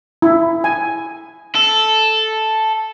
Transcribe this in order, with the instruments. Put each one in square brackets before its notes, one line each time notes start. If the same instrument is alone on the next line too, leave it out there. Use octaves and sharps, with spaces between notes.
[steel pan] E4
G#5
[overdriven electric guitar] A4